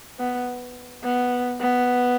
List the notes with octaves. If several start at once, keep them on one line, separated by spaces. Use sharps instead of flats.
B3
B3
B3